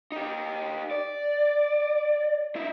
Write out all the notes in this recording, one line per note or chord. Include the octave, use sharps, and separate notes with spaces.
D#4 G4
D5
D#4 E4